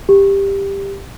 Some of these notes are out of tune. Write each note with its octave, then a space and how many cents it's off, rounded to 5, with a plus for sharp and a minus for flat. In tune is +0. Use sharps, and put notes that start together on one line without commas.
G4 +10